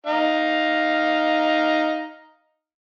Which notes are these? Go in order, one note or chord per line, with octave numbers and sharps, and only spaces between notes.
D#4 F5